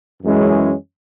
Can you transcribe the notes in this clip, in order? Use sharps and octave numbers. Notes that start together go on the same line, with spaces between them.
F#2 E3 G#3 C#4 E4